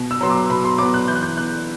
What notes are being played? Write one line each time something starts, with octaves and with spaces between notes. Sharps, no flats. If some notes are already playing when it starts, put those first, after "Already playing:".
Already playing: B2
E6
F#3 B3 C6
D6
B2 B5
C6
F#3 B3 D6
F#6
E3 G6
F#6
G6
B3 F#6